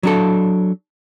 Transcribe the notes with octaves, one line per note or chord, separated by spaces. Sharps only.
F#3 D4 A4